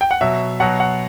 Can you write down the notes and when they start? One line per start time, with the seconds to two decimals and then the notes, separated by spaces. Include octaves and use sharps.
0.01 G5
0.11 F#5
0.21 B2 F#3 E5
0.60 B2 F#3 F#5
0.80 F#5